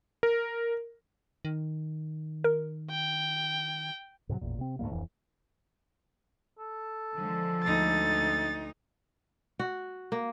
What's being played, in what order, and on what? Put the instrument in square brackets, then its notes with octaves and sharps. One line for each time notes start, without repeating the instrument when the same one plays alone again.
[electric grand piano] A#4
[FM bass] D#3
[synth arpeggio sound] A#4
[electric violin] G5
[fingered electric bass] G#2 C3 E3 F#3
A1 E2 A#2
C3 C4
D2 G#2 G3 A#3
D1 F2 E3
[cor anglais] A4
[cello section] D3 F3 G#3
[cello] D2 D#4 [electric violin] A6
[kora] F#4
A#3